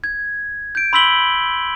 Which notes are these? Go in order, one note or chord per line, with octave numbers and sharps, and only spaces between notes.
G#6
G6 D7
B5 C6 E6 B6 F#7 G7